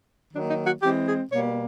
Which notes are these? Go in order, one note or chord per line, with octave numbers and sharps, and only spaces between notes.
D#3 F#3 A#3 D4
D#4
F#4
E3 G#3 C4 G4
G#4
B2 G3 A#3 C#5